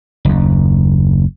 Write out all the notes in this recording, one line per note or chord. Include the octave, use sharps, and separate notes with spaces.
F#1 D#2